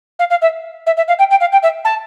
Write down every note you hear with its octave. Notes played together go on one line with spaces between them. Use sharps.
F5
F5
E5
E5
E5
F5
G5
G5
F5
G5
E5
A5